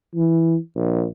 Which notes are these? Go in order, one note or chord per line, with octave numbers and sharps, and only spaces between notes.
E3
A#1